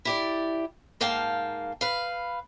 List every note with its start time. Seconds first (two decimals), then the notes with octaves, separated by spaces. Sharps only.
0.05 E4 G4 D5
1.01 G#2 A#3 F5 G5 A5
1.81 B4 F5